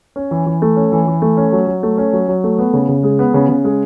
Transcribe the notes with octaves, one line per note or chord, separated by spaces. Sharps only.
C#4
E3
E3
A3
C#4
E3
E3
A3
C#4
F#3
F#3
A3
C#4
F#3
F#3
A3
B3
C#3
C#3
G#3
B3
C#3
C#3
G#3